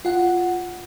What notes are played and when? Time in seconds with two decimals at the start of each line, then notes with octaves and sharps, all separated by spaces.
0.05 F4 F#5